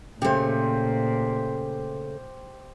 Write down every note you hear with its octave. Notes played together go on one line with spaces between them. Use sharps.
A#2 C#3 A3 G4 C5